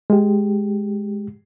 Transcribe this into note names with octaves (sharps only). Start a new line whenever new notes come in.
G#3 G4